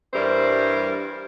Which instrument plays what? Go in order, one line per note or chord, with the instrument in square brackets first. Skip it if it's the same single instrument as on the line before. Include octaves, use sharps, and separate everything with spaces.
[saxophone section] G2 E3 G3 A#4 C5